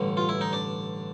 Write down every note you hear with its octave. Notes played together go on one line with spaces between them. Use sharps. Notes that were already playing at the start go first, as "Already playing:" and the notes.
Already playing: A1 G2 D3
F4
E4
D#4
D4